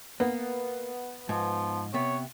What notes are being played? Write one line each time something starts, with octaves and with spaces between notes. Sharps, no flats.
A#3 B3
G#2 F3
C3 B3 C#5